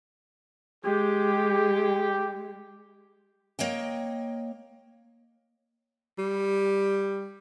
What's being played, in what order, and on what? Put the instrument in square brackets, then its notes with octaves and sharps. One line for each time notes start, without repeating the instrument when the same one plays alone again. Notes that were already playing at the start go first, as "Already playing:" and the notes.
[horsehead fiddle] G#3 [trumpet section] G4
[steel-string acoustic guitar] A#3 C#5 D#5 G5
[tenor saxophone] G3